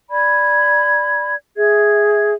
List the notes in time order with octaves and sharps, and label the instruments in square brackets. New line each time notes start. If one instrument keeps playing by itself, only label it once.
[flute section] D5 B5 G#6
G#4 E5 G#6